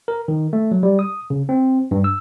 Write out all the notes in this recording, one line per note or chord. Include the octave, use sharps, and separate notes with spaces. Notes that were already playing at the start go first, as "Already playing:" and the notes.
A#4
D#3
A3
F#3
G3
D#6
C#3
C4
G2
E6